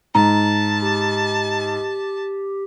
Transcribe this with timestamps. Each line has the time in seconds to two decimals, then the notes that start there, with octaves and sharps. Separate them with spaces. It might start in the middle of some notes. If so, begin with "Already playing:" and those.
0.15 G#2 A5 A#5
0.81 G4